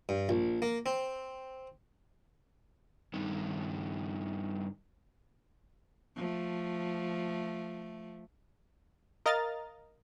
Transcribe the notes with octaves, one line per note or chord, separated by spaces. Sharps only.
G2
A#1
A#3
C4
G2 D#3
F3 A3
A#4 D#5 F5 A#5 F6 A6